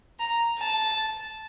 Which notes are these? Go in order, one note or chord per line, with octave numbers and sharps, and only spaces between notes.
A#5
A5